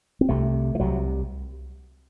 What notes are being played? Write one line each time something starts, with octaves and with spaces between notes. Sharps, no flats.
C4
C2 C3 A3
E3
C2 C3 F#3